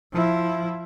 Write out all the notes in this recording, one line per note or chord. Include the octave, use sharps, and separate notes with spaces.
F3 E4